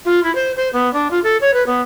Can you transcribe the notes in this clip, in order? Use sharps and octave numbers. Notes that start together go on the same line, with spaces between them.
F4
E4
C5
C5
B3
D4
F4
A4
C#5
B4
B3